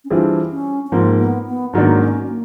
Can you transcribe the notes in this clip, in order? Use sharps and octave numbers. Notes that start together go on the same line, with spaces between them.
C#4
E3 G3 C4 D4 F4 G#4
C#4
C#4
G#2 F3 A#3 C4
B3
B3
G#2 D#3 F#3 A#3 B3 D4
C4
C#4
A#3